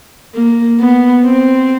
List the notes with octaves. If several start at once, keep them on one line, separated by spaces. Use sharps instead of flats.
A#3
B3
C4